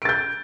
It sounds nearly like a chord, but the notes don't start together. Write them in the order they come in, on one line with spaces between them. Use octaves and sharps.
D7 A6 G6